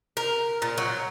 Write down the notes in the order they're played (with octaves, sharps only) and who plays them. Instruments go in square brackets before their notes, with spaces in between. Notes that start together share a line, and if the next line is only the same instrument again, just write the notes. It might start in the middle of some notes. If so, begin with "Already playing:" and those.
[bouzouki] A#4
A#2
F#3